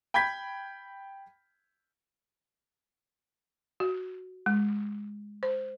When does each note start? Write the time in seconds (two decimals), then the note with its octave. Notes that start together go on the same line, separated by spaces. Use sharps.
0.14 G5 B5 G6 G#6 B6
3.80 F#4
4.46 G#3
5.43 C5